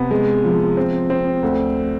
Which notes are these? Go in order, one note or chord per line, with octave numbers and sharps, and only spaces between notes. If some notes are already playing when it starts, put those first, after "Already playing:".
Already playing: C3 B3
G#3
F3
C4
C4
D2